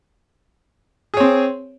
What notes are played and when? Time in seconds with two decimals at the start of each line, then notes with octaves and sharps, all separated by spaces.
1.14 G#4
1.17 C#5
1.20 C4